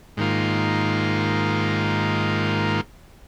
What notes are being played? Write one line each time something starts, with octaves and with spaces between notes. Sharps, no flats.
G#2 D#3 A#3 F4